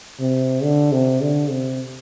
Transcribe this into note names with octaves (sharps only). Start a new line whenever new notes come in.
C3
D3
C3
D3
C3